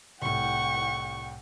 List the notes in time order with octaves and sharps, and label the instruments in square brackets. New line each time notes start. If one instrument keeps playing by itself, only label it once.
[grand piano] C2 A2 [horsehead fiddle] F#5 G5 [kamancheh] C#6